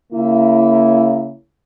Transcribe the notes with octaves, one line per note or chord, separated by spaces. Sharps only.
C#3 A#3 E4